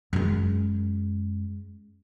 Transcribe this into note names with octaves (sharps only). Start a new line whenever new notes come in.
F#2 G#3